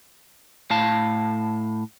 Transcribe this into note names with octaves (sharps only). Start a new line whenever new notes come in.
A2 F5 A5